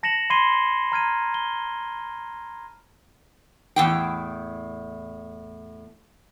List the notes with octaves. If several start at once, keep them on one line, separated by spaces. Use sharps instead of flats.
A5 A#6 C#7 E7 F#7
B5 C6 G#6 C7 D#7 G7
A#5 F6 G#6 D#7
G7
E2 A2 G5